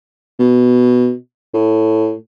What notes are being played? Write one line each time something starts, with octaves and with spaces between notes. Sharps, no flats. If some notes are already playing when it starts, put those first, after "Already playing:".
B2
A2